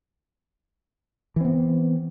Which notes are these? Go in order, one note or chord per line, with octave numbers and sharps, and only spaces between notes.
E3 B3 C4